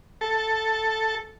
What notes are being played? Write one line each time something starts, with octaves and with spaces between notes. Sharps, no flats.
A4